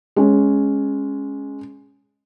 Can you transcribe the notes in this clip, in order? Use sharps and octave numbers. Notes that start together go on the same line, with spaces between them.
G#3 C#4